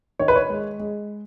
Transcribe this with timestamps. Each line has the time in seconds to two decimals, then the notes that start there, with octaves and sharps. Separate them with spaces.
0.19 D#3 C#5
0.28 B4
0.36 C#5
0.50 G#3
0.79 G#3